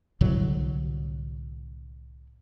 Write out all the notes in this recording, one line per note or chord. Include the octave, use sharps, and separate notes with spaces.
C2 A2 D3 F#3